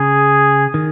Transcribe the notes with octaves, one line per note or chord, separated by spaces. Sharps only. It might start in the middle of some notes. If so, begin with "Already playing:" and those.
Already playing: C#3 G#4
D#3